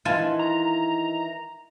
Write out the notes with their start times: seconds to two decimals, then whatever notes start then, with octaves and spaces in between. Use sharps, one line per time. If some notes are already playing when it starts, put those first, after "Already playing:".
0.05 D#3 E3 F4 G#5 A5
0.39 A#5